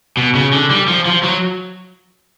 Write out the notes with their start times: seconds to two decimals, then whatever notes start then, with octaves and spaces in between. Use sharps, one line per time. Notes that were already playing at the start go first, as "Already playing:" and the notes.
0.17 B2
0.35 C#3
0.53 D3
0.70 G3
0.88 F3
1.06 F3
1.23 F#3